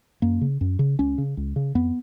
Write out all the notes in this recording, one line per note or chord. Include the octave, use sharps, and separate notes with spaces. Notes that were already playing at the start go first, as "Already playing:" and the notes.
F#2 A#3
C#3
F#2
C#3
C#2 C#4
C#3
C#2
C#3
F2 B3